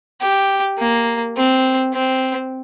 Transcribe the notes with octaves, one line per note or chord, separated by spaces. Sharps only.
G4
A#3
C4
C4